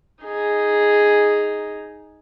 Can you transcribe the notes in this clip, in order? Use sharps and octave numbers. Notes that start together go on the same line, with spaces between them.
D#4 G#4